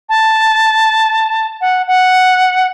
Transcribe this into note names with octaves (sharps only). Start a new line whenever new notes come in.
A5
F#5
F#5